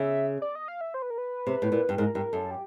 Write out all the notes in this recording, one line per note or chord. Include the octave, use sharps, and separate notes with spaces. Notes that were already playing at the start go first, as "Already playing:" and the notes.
Already playing: C#3 E5
D5
D#5
F5
E5
C5
B4
A#4
B4
C3
A2
A#2
G2
G#2 A#4
G2 A#4
F#2 A4
G4